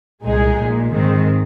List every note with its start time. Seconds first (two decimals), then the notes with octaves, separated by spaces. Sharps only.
0.24 C2 A#2 G#3 D#4 G#4
0.58 A#1 A#2 G#3
0.92 G#2 D#3 G#3 C4